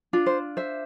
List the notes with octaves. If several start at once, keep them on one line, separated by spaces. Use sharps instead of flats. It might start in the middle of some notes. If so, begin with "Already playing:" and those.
D4 F4
C5
C5 E5